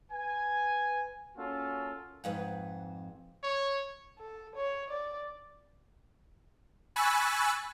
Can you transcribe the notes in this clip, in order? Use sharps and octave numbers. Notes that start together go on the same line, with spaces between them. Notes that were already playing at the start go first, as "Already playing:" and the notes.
B4 G#5
A#3 C#4 F4 F#4 A4
F2 G#2 B4
C#5
A4
C#5
D5
G#5 B5 C#6 E6 F#6 A6